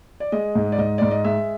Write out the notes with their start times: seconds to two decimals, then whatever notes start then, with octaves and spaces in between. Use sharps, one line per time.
0.20 D5
0.32 G#3 D#5
0.55 G#2
0.72 D5
0.78 G#2 D#5
0.98 G#2 D5
1.11 D#5
1.24 G#3 E5